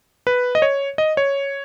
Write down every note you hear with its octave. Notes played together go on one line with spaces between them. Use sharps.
B4
D#5
C#5
D#5
C#5